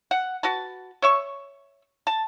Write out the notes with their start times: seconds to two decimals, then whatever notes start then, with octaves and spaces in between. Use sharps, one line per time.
0.11 F#5
0.43 F#4 B4 A5
1.02 C#5 E5 C#6
2.07 A5